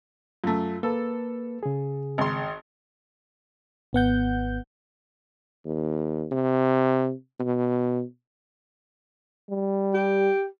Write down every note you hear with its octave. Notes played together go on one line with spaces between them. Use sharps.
F#2 A3 F4
A#3 A4 B4
C#3 G#4
G#1 C6
G#1 B3 F#5 G6
D#2
C3
B2
G3
G4